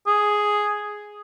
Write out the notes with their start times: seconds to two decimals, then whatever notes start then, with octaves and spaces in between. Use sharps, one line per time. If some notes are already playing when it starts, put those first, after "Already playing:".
0.07 G#4